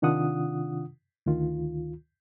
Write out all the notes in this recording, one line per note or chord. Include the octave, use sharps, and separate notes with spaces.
C3 D#3 D4 F4 F#5 D#6
D2 D#3 F4